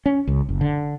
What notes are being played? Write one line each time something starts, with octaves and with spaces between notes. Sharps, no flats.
C#4
C#2
F#1
D3